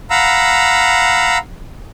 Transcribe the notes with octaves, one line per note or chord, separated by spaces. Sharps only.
F5 F#5 A#5 B5 E6